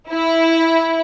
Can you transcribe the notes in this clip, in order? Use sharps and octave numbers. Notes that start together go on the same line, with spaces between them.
E4